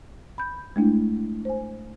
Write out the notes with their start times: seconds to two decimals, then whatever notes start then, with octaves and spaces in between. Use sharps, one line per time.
0.38 B5 G6
0.76 G#3 A3 D4 E4
1.45 C5 G#5